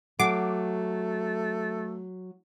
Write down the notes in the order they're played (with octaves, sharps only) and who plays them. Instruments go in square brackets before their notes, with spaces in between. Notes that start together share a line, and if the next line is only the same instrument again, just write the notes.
[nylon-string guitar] F#3 [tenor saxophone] A3 [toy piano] F#5 [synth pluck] D6